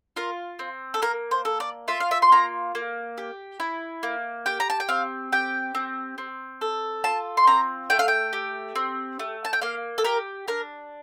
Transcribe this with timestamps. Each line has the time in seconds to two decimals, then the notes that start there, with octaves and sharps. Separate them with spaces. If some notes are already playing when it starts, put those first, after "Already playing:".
0.16 F4 A#4
0.59 C4
0.94 A4
1.02 A#3 A#4
1.31 C5
1.45 A4
1.60 D5
1.88 F4 E5
2.00 F5
2.11 E5
2.22 C6
2.32 A#3 A#5
2.75 A#3
3.18 G4
3.60 E4
4.03 A#3
4.46 G4 G5
4.60 A#5
4.70 A5
4.80 G5
4.89 C4 F5
5.32 G4 G5
5.75 C4
6.18 C4
6.61 A4
7.04 F4 A5
7.37 C6
7.47 C4 A#5
7.90 A3 G5
7.99 F5
8.08 G5
8.33 G4
8.75 C4
9.19 A3
9.45 A5
9.53 G5
9.61 A#3 F5
9.98 A4
10.04 G4 A#4
10.48 D4 A#4